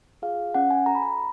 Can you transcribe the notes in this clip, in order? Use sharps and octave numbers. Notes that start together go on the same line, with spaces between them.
F4 G#4 F5
C#4 F#5
G#5
F#4 A4 A#5
B5
A#5